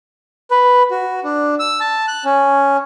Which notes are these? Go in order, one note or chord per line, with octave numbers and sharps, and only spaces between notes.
B4
F#4
D4
E6
A5
F#6
C#4